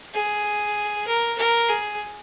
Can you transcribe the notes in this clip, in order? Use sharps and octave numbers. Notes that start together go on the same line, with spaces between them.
G#4
A#4
A#4
G#4